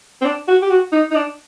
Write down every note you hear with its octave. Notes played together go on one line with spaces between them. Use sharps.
C4
D4
F#4
G4
F#4
D#4
D#4
D4